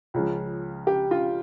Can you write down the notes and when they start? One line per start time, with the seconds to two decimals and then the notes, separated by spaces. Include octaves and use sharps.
0.14 C#2 C#3 F3
0.87 G4
1.11 F4